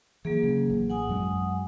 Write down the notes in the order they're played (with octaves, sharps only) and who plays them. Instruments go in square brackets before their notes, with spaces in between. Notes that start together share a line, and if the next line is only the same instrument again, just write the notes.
[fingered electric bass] E3 [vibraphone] F#3 A#3 G#4
[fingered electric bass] C#3
A1
[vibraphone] F#5 G#5 D#6
[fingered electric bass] F#2 F#3 G#3